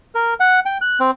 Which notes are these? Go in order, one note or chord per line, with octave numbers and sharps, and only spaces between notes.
A#4
F#5
G5
F#6
C4